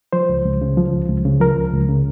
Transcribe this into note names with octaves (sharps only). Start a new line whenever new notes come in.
F3 C5
C#2
C#2
C#3
F3
C#2
C#2
C#3
F3 A#4
C#2
C#2
C#3